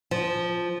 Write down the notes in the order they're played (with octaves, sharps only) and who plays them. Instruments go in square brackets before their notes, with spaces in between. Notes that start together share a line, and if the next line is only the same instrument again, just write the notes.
[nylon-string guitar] F3